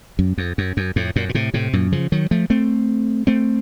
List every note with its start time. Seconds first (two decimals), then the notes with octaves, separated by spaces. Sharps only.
0.19 F#2
0.38 F2
0.58 F#2
0.77 F#2
0.96 F2 A2
1.16 F#2 A#2
1.29 A#2
1.35 A2 C3
1.54 A2 C3
1.73 F#2 A#2
1.92 C#3 F3
2.12 D#3 F#3
2.31 F3 A3
2.50 A3 C4
3.27 A3 C4